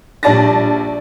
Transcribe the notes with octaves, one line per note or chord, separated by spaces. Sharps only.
A#1 G3 D5 A5 A6 A#6